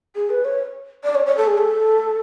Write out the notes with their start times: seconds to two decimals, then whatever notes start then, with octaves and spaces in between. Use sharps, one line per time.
0.15 G#4
0.30 B4
0.45 C#5
1.04 D5
1.15 C#5
1.26 C#5
1.37 A4
1.47 G#4
1.58 A4